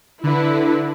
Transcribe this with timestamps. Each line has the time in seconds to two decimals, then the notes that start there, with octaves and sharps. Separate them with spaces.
0.23 D3 E4 B4